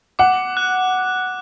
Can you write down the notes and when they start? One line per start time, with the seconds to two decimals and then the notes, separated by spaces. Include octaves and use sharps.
0.19 F#5 D6
0.57 F#6